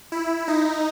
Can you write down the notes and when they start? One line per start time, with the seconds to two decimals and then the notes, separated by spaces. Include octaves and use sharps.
0.12 E4
0.48 D#4